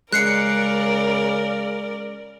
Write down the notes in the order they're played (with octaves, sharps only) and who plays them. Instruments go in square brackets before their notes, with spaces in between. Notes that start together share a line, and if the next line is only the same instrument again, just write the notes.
[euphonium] C#3 [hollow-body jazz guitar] G#3 [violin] A#4 D5 [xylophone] F#6 C7 C#7